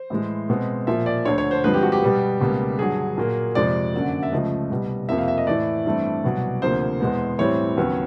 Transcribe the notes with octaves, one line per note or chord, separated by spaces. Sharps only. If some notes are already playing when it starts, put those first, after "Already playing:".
Already playing: C5
A2 E3 G#3
B2 G#3 C4
A#2 F3 A#3 E5
D5
D2 D3 F3 C#5
C#5
C5
G2 D3 F3 G#3 C4 B4
G4
F#4
G4
B2 G3 B3
C#2 B2 G3 A#3
G2 D3 F#3 G#4
A#2 F#3 A#3
F2 C3 F3 G#3 D5
F#2 D3 F#3 A#3
E5
C#2 C#3 F3 A3 D#5
C2 B2 G3
F2 C3 F3 A#3 E5
F5
E5
D#5
A2 E3 A3 D5
G2 E3 A3 C4
C2 B2 F#3
D2 C3 F3 A#3 C5
E2 B2 G#3 B3
A2 E3 G3 C4 C#5
D#2 C#3 F#3 B3